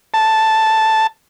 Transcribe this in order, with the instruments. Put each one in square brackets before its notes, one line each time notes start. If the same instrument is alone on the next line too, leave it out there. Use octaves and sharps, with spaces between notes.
[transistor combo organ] A5